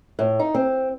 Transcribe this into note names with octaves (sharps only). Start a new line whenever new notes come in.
A2
D#4
C4